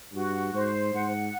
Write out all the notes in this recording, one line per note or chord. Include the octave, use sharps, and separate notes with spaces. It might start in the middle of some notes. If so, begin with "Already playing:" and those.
G2 F#4
G#2 C5
G#2 F#5